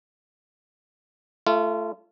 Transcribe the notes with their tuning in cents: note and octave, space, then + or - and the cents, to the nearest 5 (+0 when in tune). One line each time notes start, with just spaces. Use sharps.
A3 +0 F4 -25